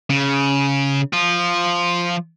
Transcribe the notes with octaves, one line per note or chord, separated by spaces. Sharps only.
C#3
F3 F4